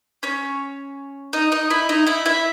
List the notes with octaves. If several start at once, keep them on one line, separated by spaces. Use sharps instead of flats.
C#4 C#5
D#4 D#5
D#4 D#5
E4 E5
D#4 D#5
E4 E5
E4 E5